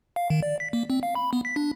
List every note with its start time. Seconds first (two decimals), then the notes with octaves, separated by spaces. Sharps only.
0.16 F5
0.30 D#3
0.43 D5
0.60 B6
0.73 A#3
0.90 C4
1.03 F5
1.15 B5
1.33 B3
1.45 B6
1.56 D4